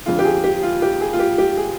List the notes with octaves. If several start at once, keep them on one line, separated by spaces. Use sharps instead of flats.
F2 D3 G#3 F4
G4
G#4
G4
F4
G4
G#4
F4
G4
G4
G#4